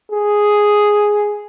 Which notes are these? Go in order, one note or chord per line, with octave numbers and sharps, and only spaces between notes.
G#4